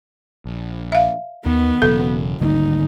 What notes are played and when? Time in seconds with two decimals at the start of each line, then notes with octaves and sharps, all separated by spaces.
0.45 A#1
0.92 E5 F5
1.46 D#2 D#3 B3
1.82 E1 C#3 F#3 A4
2.41 G#1 D2 D3 G3 A#3 D#4